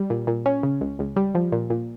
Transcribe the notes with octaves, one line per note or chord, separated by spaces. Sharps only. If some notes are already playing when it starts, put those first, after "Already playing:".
Already playing: G3
A#2
A#2
C#4
C#3
C#2
C#2
G3
F3
A#2
A#2